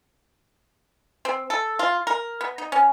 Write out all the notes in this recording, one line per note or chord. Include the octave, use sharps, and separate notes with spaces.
C4
A4
F4
A#4
B3
D#4
C#4